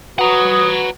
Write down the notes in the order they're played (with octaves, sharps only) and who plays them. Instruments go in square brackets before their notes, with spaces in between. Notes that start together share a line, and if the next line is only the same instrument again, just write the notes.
[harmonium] F#4 B4 [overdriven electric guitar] F#5 A#5 [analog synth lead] D#6